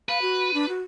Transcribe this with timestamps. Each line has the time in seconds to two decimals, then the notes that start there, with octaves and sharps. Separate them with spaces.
0.09 B4 F5
0.22 F#4
0.54 D4
0.69 F#4